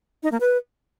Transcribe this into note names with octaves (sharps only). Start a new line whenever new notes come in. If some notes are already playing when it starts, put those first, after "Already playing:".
D#4
A#3
B4